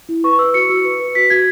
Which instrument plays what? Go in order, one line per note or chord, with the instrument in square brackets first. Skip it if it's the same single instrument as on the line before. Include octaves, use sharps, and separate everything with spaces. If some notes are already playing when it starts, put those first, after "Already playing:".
[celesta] E4
B4 C#6
B4 E6
F#4 C#7
F#4
B4
B4
F#4 B6
F#4 G#6